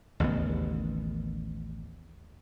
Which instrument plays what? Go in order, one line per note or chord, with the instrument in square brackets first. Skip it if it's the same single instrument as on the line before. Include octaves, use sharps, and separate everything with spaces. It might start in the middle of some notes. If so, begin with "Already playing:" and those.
[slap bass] A1 D#2 C#3 B3